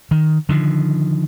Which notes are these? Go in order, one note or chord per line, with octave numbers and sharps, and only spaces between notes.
D#3
D3 D#3 F3